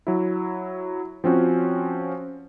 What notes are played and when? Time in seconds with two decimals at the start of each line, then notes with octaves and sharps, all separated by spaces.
0.07 F#3 E4
1.24 F3 C4 C#4 F#4